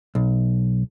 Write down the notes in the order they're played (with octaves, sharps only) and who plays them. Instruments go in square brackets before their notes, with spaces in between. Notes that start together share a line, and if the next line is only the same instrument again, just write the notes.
[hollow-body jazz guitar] B1